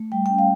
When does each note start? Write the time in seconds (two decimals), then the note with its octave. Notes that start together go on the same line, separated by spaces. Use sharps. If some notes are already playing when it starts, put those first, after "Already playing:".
Already playing: A3
0.12 G3 G5
0.26 G5
0.30 C#4
0.39 F5